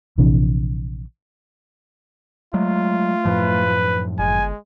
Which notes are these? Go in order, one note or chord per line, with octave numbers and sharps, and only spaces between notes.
A#1 C3 E3 D4
F#3 G#3 A3 F4
F#2 A2 F3 B4
G1 G#3 G#5